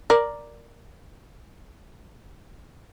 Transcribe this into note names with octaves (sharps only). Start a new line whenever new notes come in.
A#4 D5